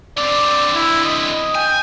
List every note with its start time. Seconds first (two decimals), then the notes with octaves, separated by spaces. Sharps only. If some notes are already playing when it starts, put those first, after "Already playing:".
0.17 D3 C4 D5
0.74 E4
1.05 D#5
1.55 G5 G#5